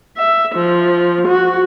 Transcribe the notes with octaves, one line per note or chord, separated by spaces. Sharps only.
E5
F3
F#4